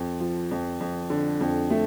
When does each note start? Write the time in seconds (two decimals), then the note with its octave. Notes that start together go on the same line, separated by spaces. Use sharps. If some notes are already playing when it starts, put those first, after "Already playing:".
Already playing: F2
0.20 F3
0.51 F2
0.81 F2
1.10 D3
1.41 F2
1.70 A3